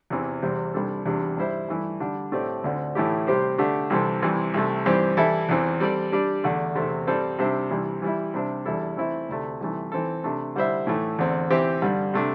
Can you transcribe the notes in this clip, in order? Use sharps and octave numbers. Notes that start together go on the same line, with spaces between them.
E2 C3 E3 C4
E2 C3 G3 C4
C2 C3 G3 D4 A4
E2 C3 G3 D4 G4
G2 G3 E4 C5 E5
G2 E3 A3 E4
D3 G3 D4
A2 A3 C4 G4 D5
D2 D3 C4
A2 E3 A3 E4 G4
C3 G3 C4 G4 C5
D3 A3 D4 G4
C2 C3 E3 C4 A4
C2 C3 E3
C2 C3 A3
G2 E3 C4 G4 C5
E3 G3 E4 A4 E5
E2 E3 C4
G3 C4 A4 D5
G3 D4 G4 D5
E2 D3 A3
E2 C3 A3 C4 A4
G2 G3 C4 A4 C5
C3 G3 D4 C5 E5
C2 C3 E3 G3
E3 G3 E4
C3 G3 D4 C5 E5
E2 E3 G3 E4 A4
E3 A3 C4 E4 A4
D2 C3 A3
C2 C3 E3 A3
E3 C4 A4
C3 A3 D4
D3 G3 E4 C5 E5
A2 E3 A3
E2 D3 C4
E3 C4 G4 C5 E5
G2 D3 G3
C3 A3 D4